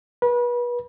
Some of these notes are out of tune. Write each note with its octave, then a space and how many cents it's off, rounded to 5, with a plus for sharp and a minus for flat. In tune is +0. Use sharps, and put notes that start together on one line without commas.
B4 -30